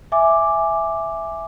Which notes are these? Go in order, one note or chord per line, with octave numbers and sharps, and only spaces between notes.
E5 G#5 D6